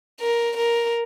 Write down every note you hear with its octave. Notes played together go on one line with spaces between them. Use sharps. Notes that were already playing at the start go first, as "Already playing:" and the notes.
A#4
A#4